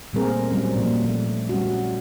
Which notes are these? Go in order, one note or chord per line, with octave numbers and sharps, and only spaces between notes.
A#2 G3 A3 C4 G#4 A#4
F#3 G3 C4 C#4
A#2 F3
A3
G3 C#4 F#4